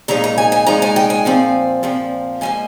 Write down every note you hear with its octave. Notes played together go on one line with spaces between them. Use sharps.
A#2 F3 G#3 D#4 A#5
A#5
G#5
G#5
A#2 F3 G#3 D#4 A#5
G#5
G5
G#5
A#2 F3 C4
A#2 F3 C4
G#2 F3 A#3 G#5